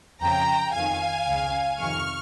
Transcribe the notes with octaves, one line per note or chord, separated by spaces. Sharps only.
F2 C#3 G5 A#5
F2 D#3 F5 G#5
C#2 C#3
F2 C3 D#3 C#6 F6